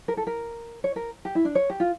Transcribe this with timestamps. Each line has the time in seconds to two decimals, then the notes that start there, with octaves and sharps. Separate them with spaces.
0.08 A#4
0.17 A4
0.27 A#4
0.84 C#5
0.96 A#4
1.25 G4
1.35 E4
1.45 D4
1.55 C#5
1.70 G4
1.80 F4